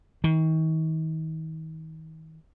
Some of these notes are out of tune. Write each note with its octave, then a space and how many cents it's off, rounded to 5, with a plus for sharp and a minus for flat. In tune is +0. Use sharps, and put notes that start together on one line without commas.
D#3 +40